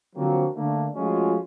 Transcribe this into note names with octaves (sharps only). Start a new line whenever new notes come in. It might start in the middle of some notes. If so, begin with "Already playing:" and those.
D3 F3 F#3 A#3 C4 F#4
D3 A3 A#3 D4
F3 G#3 A3 C#4 F4 F#4